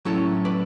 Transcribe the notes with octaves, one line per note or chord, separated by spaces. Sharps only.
A2 F#3 C#4 E4 A4 C#5
B4 D5